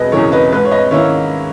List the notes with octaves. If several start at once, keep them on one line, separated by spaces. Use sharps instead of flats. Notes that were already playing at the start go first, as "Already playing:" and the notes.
Already playing: E1 B4 D#5
E2 C#3 E3 A#4 C#5
B4 D#5
G#2 B4
C#5
B4 D#5
D#3 A#3 C#4 E4 C#5 E5